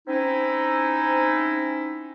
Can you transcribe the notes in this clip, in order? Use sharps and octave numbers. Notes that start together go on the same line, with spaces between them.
C4 C#4 D#4 E4